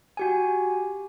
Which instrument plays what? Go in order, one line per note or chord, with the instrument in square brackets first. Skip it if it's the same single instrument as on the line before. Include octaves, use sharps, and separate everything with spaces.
[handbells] F#4 G4 G#5